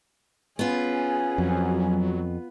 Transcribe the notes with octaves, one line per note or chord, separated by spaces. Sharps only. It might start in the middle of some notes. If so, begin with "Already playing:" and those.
B3 C#4 F4 G#4
F2 F#3